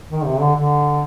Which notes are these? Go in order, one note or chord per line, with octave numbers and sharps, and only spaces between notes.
D#3
C3
D3
D3